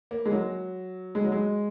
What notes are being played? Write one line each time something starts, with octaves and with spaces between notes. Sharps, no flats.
A#3
G#3
F#3
G#3
F#3
G#3